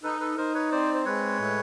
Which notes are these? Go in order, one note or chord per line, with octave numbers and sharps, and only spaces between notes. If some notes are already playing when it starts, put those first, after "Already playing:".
D#4 A4 B4
A4 B4
D#4 A#4 C5
B4 C#5
C4 C5 D5
C5
G#3 B4 C#5
A2